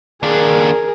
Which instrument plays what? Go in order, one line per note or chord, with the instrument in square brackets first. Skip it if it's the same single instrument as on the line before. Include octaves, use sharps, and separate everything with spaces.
[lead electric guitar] D#2 D4 [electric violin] G#4 A#4